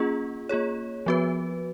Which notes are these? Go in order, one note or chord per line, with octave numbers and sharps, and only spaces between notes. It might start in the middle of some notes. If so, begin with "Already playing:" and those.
Already playing: A#3 C#4 F4 G#4
A#3 F4 G#4 C#5
F3 B3 F#4 B4